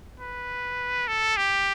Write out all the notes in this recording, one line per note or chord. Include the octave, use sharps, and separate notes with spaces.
B4
A4
G4